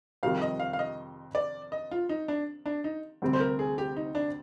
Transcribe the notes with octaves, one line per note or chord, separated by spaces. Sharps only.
F2 C3 D#3 G3 F5
D#5
F5
F5
D#5
D5
D#5
F4
D#4
D4
D4
D#4
D2 C3 G3 C4
C5
A#4
G#4
G4
D#4
D4